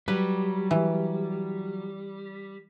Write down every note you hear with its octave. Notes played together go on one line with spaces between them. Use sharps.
F#3 G3 B4
E3